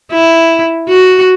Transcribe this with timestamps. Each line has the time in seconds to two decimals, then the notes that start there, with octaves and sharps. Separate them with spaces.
0.12 E4
0.88 F#4